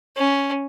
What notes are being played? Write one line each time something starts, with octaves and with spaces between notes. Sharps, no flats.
C#4